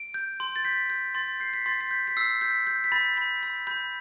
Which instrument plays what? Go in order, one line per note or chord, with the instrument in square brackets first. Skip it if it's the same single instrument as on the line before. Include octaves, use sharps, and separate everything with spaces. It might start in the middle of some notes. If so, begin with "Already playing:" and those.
Already playing: [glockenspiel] D7
G6
C6
A6
G6 B6
G6
C6 A6
G6 C7
B6
C6 A6
B6
G6
B6
E6 C7
G6 B6
G6
B6
B5 A6
B5
B5
B5 G6